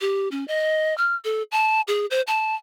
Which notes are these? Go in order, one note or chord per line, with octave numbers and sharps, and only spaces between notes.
G4
C#4
D#5
F6
A4
A5
G#4
C5
A5